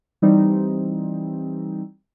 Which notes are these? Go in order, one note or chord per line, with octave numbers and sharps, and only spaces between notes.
E3 G3 C4 D#4